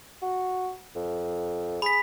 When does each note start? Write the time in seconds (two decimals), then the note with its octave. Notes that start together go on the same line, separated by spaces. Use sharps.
0.22 F#4
0.95 F2
1.82 G#4 B5 B6